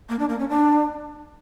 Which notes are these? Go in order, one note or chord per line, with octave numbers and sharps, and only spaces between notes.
A#3
D4
A#3
C#4
D4